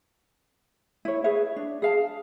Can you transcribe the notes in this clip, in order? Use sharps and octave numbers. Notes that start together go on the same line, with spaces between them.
E4 C#5
G#4 B4 C#5 E5
D4
G#4 F5 A5